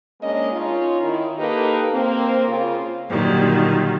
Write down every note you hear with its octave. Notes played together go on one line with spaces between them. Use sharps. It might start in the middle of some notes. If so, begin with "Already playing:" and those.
G#3 A#3 C#4 D4 D#5
C#4 D#4 F4 C#5
D#3 E4
A#3 D#4 G4 A4 B4
A#3 C4
C#3 F4
A#2 D3 D#3 F#3 G3